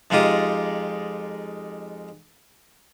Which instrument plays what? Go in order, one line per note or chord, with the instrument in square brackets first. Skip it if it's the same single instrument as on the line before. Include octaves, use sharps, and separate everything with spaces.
[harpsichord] F2 G#3 D#4 F4 G4 D#6